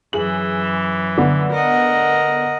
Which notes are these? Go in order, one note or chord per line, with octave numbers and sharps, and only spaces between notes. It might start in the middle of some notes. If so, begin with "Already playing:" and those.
F#2 E3 G#4 F#7
D3 B3
A#4 D#5 F#5